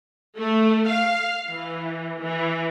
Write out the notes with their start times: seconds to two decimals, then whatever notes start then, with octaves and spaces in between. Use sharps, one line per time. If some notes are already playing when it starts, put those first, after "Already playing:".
0.39 A3
0.89 F5
1.50 E3
2.21 E3